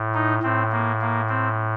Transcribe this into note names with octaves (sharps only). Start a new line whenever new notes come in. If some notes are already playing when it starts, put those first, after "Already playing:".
Already playing: A2
D#4
A2 C4
A#3
A#3
C4